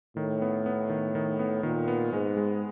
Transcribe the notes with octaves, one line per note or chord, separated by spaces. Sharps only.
A2 D#3
B3
B3
D#3
D#3
B3
A#2 D#3
B3
G#2 G#3
G#3